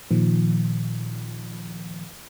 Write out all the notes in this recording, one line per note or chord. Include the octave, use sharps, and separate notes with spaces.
A#2 D#3 F3